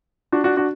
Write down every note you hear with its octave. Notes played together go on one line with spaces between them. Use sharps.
D4 F#4
D4 F#4
D4 F#4